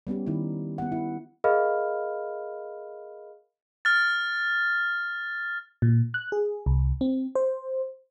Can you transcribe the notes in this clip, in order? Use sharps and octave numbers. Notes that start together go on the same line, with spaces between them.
G3 B3 C#4 G4
D#3 B3 D#4 E4
B3 F#5
E4
G#4 A#4 D#5 F5 B5 F6
F6 A6
A#2
F#6
G#4
C2
C4
C5